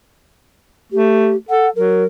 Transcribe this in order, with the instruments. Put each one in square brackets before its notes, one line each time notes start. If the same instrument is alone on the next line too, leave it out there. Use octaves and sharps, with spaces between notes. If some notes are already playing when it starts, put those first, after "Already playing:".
[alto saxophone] A3 [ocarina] G4
[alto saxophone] A4 [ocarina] F#5
[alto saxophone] F#3 [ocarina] A#4